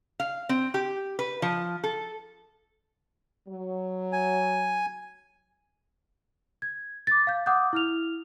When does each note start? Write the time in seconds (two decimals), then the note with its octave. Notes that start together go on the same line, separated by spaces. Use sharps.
0.20 F5
0.49 C4
0.74 G4
1.19 B4
1.42 F3
1.84 A4
3.48 F#3
4.13 G#5
6.62 G#6
7.07 D6 A6
7.27 F5 G6
7.46 F#5 D6 D#6 F#6 G6
7.73 E4 F6 F7